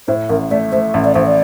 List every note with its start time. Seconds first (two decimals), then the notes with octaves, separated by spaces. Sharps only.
0.08 A2 C5
0.29 A1 A#4
0.51 A3 D5
0.72 A3 C5
0.94 A1
1.05 D5
1.15 A1 C5
1.26 D5